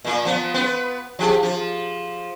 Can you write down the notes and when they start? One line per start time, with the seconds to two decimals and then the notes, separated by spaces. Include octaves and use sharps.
0.05 A#2 A#3
0.25 F3 B3
0.54 B3 B4
1.19 F3 G4 G#4
1.43 F3